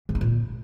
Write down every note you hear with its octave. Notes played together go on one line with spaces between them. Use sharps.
E3
D#4
A#2